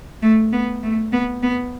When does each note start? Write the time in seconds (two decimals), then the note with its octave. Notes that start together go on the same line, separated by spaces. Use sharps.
0.22 A3
0.52 B3
0.83 A3
1.13 B3
1.43 B3